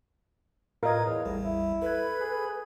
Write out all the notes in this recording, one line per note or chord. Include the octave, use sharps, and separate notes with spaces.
A2 F4 A#4 B4 D#5 G#6
E2 C#5
A1 E2 A2 G3
E4
A4 B4 B5 G#6
G#4